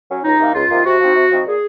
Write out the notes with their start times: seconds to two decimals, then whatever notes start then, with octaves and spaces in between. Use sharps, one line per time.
0.09 F#3 C#4
0.23 C#2 D#4
0.39 C3 D#3 A#3
0.54 C#2 F4
0.69 C3 D#3 A#3
0.84 C3 F#4
1.00 F3 C4 D#4
1.15 C3
1.30 F3 C4 D#4
1.45 A#2 G#4